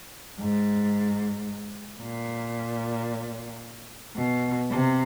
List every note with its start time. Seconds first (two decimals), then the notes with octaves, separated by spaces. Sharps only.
0.39 G#2
2.01 A#2
4.15 B2
4.70 C3